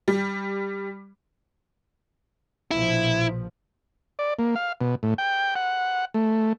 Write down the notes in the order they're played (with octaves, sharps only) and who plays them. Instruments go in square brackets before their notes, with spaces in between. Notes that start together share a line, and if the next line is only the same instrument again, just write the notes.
[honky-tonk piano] G3
[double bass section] A#1 B2 F3 [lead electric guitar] E4
[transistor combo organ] D5
A#3
F5
B2
A2
G5
F#5
A3